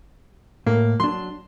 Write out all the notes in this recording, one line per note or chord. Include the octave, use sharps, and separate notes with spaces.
A2 A#3
F#3 D4 C6